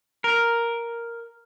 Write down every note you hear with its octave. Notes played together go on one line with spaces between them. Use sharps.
A#4